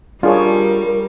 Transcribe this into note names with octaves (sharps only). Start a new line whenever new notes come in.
G3 D4 F4 G#4 A#4 C#5